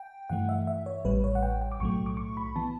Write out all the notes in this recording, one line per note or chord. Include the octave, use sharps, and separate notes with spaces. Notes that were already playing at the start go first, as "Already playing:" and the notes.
Already playing: G5
G2 E3 A3 F#5
E5
E5
C#5
A1 A2 G3 B4
C#5
F#5
G5
G5
D6
B1 A2 F#3 A3 C#6
D6
C#6
B5
E3 B3 A5